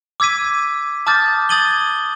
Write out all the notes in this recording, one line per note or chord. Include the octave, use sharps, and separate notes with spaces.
D6 E6 G#6 B6 D#7
A5 D6 D#6 F6 G6 A6
D#6 G#6 A6 D#7 F#7 G7